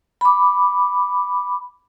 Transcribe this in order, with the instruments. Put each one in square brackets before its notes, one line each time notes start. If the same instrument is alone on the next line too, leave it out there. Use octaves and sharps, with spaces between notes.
[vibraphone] B5 D6